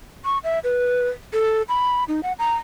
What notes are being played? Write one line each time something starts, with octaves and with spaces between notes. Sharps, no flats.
C#6
E5
B4
A4
B5
D#4
F#5
A#5